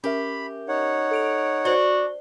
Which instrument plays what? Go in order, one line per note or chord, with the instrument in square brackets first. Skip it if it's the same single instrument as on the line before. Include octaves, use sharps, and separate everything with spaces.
[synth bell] C#4 A#4 E5 [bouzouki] G4 [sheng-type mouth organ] B5
[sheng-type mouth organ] D#4 C#5 F#5
[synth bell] A4 D7 F7
[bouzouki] D4 [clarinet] F#4 [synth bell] C5 G7